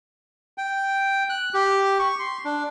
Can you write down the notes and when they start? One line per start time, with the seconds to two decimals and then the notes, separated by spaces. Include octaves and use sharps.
0.58 G5
1.30 F#6
1.54 G4
1.99 C#6
2.19 C6
2.45 D4